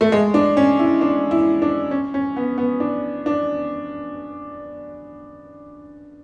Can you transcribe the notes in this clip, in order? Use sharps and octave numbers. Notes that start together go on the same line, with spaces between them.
A3
G#3
D4
C#4
E4
D4
E4
D4
C#4
C#4
B3
B3
D4
D4